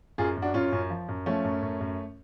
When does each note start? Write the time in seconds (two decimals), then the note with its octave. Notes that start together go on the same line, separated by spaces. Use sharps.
0.18 F#2 F4 G#4
0.37 F#2
0.42 D4 F#4
0.54 F#2 C#4 F4
0.72 F#2
0.90 F3
1.08 F#2
1.26 F3 A3 C#4
1.44 F#2
1.62 F#2
1.81 F#2